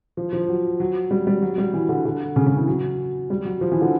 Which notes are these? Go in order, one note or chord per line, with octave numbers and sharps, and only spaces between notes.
F3
F3
F#3
F#3
G3
G3
F#3
G3
E3
D3
D3
C#3
C#3
E3
F#3
G3
F#3
F3
E3
D3